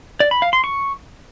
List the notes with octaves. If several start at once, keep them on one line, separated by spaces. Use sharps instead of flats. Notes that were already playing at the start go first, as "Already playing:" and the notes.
D5
B5
F5
C6
C#6